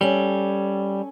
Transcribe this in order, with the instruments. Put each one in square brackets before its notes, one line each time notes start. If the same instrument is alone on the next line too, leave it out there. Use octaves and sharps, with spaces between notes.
[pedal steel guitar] G3 [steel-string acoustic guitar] C#4 A4